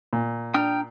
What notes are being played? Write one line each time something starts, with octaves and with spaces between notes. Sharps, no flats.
A#2
D4 G5 A#5 D#6 F6